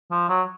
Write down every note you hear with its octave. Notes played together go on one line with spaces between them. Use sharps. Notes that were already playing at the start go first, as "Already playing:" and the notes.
F3
F#3